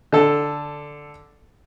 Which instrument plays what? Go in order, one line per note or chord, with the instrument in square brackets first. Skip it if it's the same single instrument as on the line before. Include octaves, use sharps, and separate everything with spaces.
[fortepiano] D3 A4